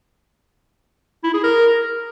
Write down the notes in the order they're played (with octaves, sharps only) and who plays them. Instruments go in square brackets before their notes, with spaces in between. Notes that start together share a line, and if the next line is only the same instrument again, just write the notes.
[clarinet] E4
G#4
A#4